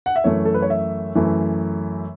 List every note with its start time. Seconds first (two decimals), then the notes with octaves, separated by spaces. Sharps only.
0.06 F#5
0.16 E5
0.24 F#2 E3 A3 C#5
0.45 A4
0.54 B4
0.62 C#5
0.70 E5
1.15 F#2 E3 A3